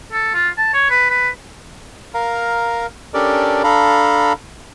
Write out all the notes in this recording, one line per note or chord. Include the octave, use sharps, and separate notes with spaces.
A4
F4
A5
C#5
B4
B4
A#4 F5 A#5
C#4 D4 G4 A4 A#4 D5
D4 A4 F5 A#5 B5